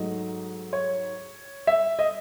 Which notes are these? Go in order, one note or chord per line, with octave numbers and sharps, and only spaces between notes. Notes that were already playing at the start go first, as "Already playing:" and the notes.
Already playing: G#2 F#3 A3 D#5
C#5
E5
D#5